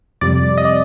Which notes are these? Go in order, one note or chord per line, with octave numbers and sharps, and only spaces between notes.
F2 C3 G3 D5
D#5
D5